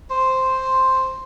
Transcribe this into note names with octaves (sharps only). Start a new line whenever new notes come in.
C5